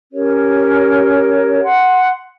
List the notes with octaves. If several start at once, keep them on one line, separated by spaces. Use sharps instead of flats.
C#4 G4 A#4 C#5
F#5 C6